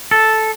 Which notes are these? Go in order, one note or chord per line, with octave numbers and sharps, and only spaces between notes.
A4